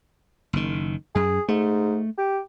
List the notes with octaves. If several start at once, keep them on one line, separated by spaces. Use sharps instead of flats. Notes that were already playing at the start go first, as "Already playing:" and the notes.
F#1 D#3
F#2 G#4
G#2 A3
G4